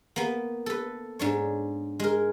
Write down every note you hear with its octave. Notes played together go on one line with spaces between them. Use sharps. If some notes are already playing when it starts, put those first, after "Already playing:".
A#3 B3
A4 B4
G#2 D4 C#5
G#3 A#4